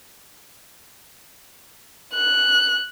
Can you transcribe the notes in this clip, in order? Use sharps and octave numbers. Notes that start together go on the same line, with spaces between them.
F#6